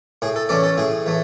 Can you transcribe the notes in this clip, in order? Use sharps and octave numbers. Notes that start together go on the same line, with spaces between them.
A2 G#4
A4
E3 A3 C#4 D5
A4
A2 G#4
E3 A3